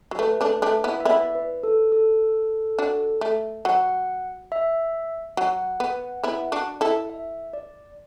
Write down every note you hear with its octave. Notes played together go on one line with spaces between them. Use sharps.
F#3
A3 B4
A3 D4
A3 D4
B3 E4
E5
B3 E4 D5
B4
A4
A4
D4 F#4
A3
F#3 F#5
E5
F#3 F#5
B3
B3 E4
D4 F#4
E4 A4
E5
D5